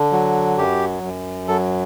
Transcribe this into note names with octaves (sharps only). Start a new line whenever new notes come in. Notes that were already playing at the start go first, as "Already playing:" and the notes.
Already playing: D3
F#3
F#2 G4
F#2
F#3 A4